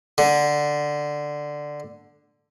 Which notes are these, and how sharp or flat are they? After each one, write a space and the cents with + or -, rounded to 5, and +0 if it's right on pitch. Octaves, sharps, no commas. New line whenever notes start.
D3 +5